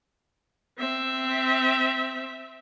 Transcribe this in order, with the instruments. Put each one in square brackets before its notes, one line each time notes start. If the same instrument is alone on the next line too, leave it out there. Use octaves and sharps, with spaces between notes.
[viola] C4 E5